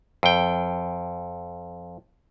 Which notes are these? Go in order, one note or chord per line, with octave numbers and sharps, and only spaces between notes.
F2 G5